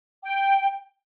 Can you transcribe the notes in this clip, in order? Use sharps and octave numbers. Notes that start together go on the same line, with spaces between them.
G5